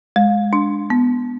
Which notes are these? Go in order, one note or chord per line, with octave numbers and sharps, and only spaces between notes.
G#3
D4
B3